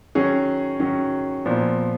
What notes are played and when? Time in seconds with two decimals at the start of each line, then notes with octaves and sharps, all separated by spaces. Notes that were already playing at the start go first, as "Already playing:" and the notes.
0.15 D#3 F#3 C#4 G#4
0.80 D#3 F#3 C#4
1.45 A#2 F3 B3